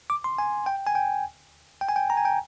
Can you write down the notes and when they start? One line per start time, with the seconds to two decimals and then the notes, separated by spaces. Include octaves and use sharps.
0.10 D6
0.24 C6
0.38 G#5
0.66 G5
0.87 G#5
0.95 G5
1.81 G5
1.88 G#5
1.96 G5
2.10 A#5
2.17 G#5
2.25 G5